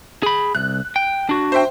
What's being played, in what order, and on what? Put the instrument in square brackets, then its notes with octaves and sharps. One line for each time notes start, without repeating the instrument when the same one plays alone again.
[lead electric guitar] G#4 B5
[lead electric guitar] C2 [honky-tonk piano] F#6
[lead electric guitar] G5
D4 F#4
[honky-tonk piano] C5 E5 G5